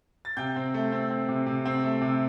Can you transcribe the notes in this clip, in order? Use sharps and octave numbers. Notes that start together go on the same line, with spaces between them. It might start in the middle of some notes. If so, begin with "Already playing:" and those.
A6
C3 G5 G6
C4
A3
C4
C4
C3
C3
C4
A3
C3